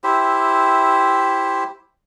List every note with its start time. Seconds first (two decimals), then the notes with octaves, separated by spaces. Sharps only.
0.04 E4 G4 C5 E5